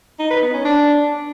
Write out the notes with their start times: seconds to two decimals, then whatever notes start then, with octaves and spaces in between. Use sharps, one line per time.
0.19 D#4
0.31 B4
0.42 B3
0.54 C#4
0.65 D4